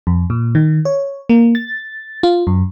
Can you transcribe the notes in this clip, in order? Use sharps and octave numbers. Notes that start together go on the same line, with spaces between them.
F2
A#2
D#3
C#5
A#3
A6
F4
F#2